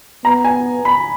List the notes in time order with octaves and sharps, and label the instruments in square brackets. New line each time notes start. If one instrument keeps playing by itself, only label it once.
[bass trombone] B3 [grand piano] A#5
[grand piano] G#5
B5